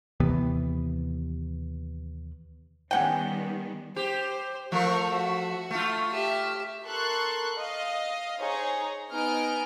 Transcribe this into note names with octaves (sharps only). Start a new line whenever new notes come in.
D#2 C3 E3 B3
D#3 G3 B3 C#4 F#5 G5
G4 C5
F3 A3 A#4 C#6
F#4 E5
A3 F4
G4 E5
A4 A#4 C6 C#6 F#6
D#5 F5
D#4 G#4 C5 C#5 A#5
B3 D#4 D#5 G#5 F6 D7